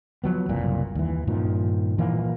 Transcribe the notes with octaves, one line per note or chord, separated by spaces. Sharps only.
F3 F#3 B3
F#1 C2 A#2
D#2 E3
G2 A#2 D#3 F3
A#2 E3 F3 A#3